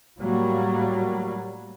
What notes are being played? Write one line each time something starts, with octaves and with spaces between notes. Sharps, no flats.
A2 F#3 G3 A#3